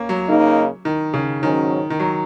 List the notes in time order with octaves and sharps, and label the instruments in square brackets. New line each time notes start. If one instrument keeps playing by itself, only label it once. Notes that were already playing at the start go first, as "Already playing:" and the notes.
Already playing: [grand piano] A#3 C#4
F#3
[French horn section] C#3 A#3 D#4
[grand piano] D#3
C#3
[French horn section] G#2 F#3 C#4 [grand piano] D#3
[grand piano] D#3
F#3